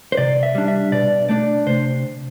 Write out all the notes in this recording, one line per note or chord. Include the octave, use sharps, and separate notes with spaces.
C5
C3 D5
E5
G3 D4
E5
B2 D5
A3 D4 D5
C3 C5